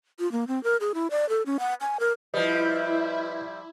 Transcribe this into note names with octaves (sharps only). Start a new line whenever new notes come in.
F4
A#3
C4
A#4
G#4
E4
D5
A4
C#4
F#5
G#5
A#4
F3 G3 E4 B4 D#5